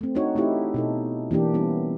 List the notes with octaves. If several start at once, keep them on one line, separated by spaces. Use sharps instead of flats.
A3 C4
D4 D#4 F#4 C#5
A3 C4 D#4 E4 G4
B2 D#4 A4
E3 A#3 D4 G4
G3 B3 C#4 E4